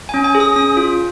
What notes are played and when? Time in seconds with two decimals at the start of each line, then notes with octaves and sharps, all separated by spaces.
0.09 G#5
0.14 C#4
0.24 G#5
0.35 G#4
0.40 D#6
0.56 C#4 D#6
0.77 F4